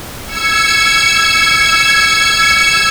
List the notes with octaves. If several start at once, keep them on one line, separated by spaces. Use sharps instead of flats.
E6 G#6 C#7